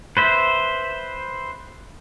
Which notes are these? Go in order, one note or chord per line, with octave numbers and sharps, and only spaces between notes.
B4 C5 E5